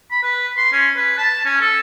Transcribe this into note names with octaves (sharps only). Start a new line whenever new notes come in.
B5
B4
C6
C#4
B4
A5
C#4
A4